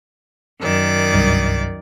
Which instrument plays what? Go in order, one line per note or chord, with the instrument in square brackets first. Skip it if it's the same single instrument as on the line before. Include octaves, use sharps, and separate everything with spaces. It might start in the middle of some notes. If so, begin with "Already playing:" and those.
[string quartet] F#2 D#3 D5
[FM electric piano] C2 G2